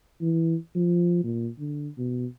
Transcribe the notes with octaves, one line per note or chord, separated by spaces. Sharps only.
E3
F3
A#2
D3
B2